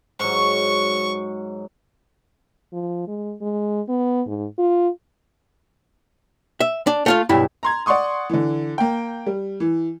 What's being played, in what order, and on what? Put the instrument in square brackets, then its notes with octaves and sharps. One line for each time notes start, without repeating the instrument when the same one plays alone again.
[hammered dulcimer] G#2 F#3 [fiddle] C#6
[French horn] F3
G#3
G#3
B3
G#2
F4
[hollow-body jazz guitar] E5
D4
A3 F4 F5
B1 G2 E4
[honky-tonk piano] A#5 C6 G#6
D5 F#5 C6 C#6 D#6
D3 E3
A#3 G5
G3
E3